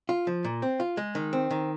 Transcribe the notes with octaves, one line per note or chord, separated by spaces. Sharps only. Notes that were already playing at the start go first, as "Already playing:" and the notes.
F4
F3
A#2
C4
F4
G#3
D#3
C4
D#3